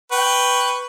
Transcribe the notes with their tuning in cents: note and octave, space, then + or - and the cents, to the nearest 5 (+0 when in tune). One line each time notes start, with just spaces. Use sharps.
B4 +0 G5 +0 C#6 +0